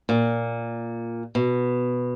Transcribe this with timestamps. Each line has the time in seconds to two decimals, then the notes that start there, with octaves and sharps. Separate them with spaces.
0.09 A#2
1.35 B2